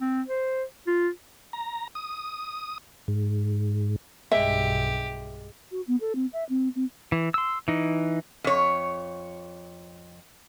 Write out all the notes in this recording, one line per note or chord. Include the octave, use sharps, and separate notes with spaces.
C4
C5
F4
A#5
D#6
G#2
B1 G2 G#3 G4 E5
F#4
B3
A4
C4
E5
C4
C4
E3
C6 E6
E3 D#4
F2 C#5